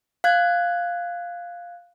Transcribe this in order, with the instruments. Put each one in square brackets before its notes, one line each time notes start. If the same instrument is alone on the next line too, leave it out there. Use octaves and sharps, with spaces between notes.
[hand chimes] F5 F#6 G#6